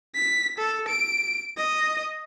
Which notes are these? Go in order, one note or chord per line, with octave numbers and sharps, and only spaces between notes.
B6
A4
D7
D#5